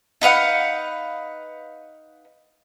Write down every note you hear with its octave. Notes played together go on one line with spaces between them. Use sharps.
D#4 B4 F5 F#5